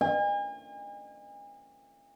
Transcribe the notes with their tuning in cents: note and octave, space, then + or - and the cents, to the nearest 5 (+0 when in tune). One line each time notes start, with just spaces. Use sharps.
G#5 -40